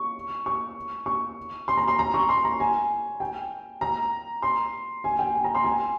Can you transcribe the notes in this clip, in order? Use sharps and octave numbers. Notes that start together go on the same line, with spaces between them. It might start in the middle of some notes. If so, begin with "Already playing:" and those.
Already playing: C#6
C#6
C#6
C6
A#5
C6
A#5
C#6
C6
A#5
G#5
G5
A#5
C6
G#5
G5
G#5
A#5
C6
G#5